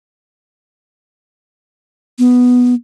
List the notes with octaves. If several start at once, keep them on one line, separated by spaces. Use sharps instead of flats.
B3